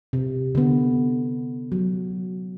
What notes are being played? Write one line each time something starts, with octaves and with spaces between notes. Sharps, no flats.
C3
D3 B3
F#3